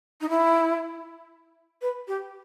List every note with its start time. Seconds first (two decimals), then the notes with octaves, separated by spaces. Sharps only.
0.21 D#4
0.29 E4
1.82 B4
2.08 G4